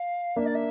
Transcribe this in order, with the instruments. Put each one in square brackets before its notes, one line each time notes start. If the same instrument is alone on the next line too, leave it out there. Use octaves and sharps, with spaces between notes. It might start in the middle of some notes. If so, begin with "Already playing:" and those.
Already playing: [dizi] F5
[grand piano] A#3 D4 [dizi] E5
[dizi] D5
E5